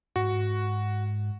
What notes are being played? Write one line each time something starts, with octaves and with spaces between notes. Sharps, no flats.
G#2 F#4